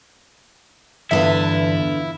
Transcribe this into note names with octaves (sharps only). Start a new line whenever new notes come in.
E2 G2 D3 E4 F4 B4 E5 F5